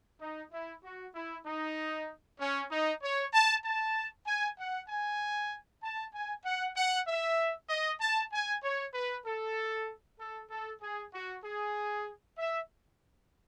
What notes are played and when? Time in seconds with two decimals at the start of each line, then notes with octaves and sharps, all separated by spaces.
0.21 D#4
0.52 E4
0.84 F#4
1.15 E4
1.46 D#4
2.40 C#4
2.71 D#4
3.02 C#5
3.33 A5
3.64 A5
4.27 G#5
4.58 F#5
4.89 G#5
5.82 A5
6.14 G#5
6.45 F#5
6.77 F#5
7.08 E5
7.70 D#5
8.01 A5
8.32 G#5
8.64 C#5
8.94 B4
9.26 A4
10.20 A4
10.51 A4
10.82 G#4
11.13 F#4
11.44 G#4
12.38 E5